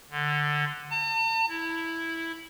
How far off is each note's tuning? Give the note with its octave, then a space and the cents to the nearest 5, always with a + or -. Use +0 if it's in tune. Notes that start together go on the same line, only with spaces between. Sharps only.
D3 +10
A5 +45
E4 -5